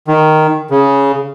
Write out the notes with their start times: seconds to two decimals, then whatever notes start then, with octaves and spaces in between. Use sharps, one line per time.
0.08 D#3
0.70 C#3